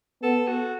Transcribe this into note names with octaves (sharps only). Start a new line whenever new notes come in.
B3 A4
F#4